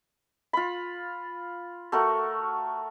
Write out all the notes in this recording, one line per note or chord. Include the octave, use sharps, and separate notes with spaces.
F4 B5
A3 F#4 A#4 C#6